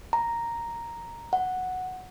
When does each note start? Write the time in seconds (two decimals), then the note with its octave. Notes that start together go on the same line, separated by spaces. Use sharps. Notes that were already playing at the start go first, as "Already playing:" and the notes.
0.13 A#5
1.33 F#5